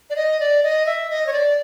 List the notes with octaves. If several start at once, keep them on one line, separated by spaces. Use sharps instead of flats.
D5
D#5
D5
D#5
E5
D#5
C#5
D5